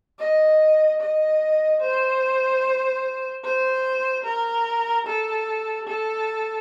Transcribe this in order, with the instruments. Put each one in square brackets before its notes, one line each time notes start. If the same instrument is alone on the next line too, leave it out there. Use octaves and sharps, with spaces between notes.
[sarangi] D#5
D#5
C5
C5
A#4
A4
A4